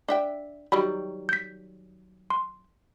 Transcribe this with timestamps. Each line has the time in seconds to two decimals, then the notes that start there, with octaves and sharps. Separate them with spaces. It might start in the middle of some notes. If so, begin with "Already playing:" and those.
0.08 D4 E5 G5
0.72 D#3 F#3 G3 B5
1.29 G6 B6
2.30 C6